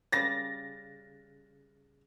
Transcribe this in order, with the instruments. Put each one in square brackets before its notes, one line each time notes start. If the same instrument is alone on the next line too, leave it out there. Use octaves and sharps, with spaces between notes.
[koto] C#3 G3 [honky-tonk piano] A6 A#6